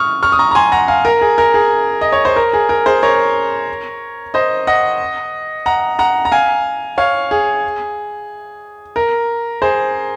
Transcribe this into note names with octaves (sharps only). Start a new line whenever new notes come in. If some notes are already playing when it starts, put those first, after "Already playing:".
Already playing: C#6 D#6 F6
C#6 F6
D#6
A#5 C#6
A#5
G#5 C6
F#5 A#5
F5 G#5
A#4
G#4
A#4
G#4
D#5
C#5
C5
A#4
G#4
A#4
G#4 C5
A#4 C#5
C5 D#5
D#5 F#5
F#5 A#5
F#5 A#5
A#5
F5 G#5
C#5 F5
G#4
A#4
G#4 C5